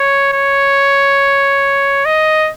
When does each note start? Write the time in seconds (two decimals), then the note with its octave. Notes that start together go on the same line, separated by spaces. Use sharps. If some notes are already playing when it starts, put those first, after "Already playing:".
Already playing: C#5
0.33 C#5
2.05 D#5